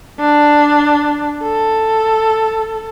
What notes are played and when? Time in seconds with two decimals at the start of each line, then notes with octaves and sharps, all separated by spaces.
0.20 D4
1.43 A4